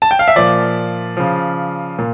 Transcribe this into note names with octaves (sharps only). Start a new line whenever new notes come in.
A5
G5
F5
E5
A#2 F3 D5
C#3 F3
A#2